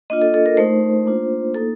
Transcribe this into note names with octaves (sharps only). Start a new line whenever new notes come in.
A#3 D4 F4 D#5
A4
A4
A#4
A3 D#4 C5
A#3 D4 F4
A#3 D#4 A4